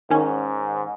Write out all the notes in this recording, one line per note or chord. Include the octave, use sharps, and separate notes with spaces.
G#2 D#3 C#4